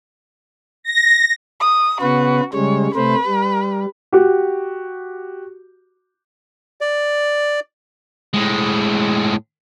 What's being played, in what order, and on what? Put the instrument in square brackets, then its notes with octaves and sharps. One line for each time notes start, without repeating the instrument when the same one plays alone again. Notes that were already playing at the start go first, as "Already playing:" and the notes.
[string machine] A#6
[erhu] D#6
[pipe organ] C#3 B3 B4 [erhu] F#4
[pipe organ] C#3 G3 G#3 [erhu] C#5
[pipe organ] C3 A3 C5 [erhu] B4
[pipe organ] G3
[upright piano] F#4 G4
[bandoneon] D5
[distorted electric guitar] A2 G#3